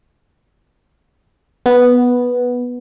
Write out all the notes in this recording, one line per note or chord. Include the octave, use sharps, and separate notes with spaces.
B3